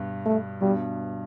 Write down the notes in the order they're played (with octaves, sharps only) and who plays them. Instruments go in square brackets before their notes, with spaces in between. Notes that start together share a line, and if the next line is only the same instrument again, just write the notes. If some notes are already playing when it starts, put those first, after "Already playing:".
Already playing: [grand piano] G2 B2
[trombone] A3
[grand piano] G2 B2 [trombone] G3